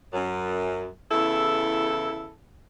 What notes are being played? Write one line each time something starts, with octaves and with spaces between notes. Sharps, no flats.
F#2
E2 C#3 E4 A4